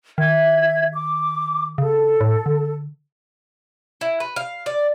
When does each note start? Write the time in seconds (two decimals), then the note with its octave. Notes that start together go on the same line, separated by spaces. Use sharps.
0.18 D#3 E5 G#6
0.93 D6
1.78 C#3 A4
2.21 A2
2.46 D3
4.01 E4
4.20 B4
4.36 F5
4.66 D5